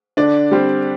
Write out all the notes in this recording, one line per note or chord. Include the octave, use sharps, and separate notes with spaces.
D3 D4 D5
G3 C4